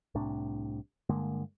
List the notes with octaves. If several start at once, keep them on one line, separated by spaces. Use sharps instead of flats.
C2 A2 C3 D4
G2 D3 G#3 A#3